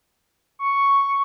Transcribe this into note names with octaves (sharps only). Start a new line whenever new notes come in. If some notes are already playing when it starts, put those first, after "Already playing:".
C#6